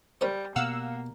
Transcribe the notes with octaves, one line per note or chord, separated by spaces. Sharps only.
G3 C#4 A#4 C5
B2 A#3 B3 F5 F#5 E6